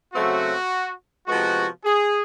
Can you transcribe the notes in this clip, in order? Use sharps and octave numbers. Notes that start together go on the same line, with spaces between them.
C#3 F#3 A3 C4 F#4
C3 F3 G#3 B3 F#4
G#4